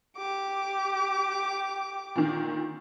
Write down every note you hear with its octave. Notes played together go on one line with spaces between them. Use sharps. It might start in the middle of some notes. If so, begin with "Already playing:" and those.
G4 D6
A#2 D3 D#3